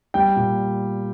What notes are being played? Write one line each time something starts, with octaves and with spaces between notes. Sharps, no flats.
G3 G5
A#2